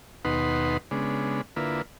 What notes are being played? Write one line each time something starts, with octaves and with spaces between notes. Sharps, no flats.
D#2 B2 D#4 B4 F#5 C6
C#3 G#3 B3 D4
D3 A#3 E4 F4 B4